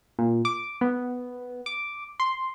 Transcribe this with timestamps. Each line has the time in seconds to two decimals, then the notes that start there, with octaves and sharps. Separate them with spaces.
0.19 A#2
0.45 D6
0.81 B3
1.66 D6
2.20 C6